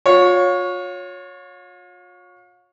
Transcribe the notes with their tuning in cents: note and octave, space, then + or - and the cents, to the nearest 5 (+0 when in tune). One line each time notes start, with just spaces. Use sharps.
F4 +40 C#5 +0